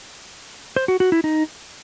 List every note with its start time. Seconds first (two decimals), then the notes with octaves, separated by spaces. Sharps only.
0.76 C5
0.88 F#4
1.00 F#4
1.12 E4
1.24 D#4